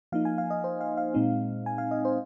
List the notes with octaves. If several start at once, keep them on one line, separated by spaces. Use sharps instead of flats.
F3 A#3 D#4 F5
G#5
F5
D#5
C5
F5
F5
A#2 G#3 C4 D#4
G#5
F5
D#5
C5